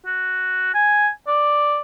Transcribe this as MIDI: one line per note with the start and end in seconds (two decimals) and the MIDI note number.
0.06 0.69 66
0.75 1.09 80
1.27 1.80 74